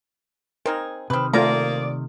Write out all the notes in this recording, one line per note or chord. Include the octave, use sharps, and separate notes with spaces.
C4 D#4 G#4 A#4
C3 D#3 C4 B4
A3 A#3 C4 F4 A#4 D5 A#5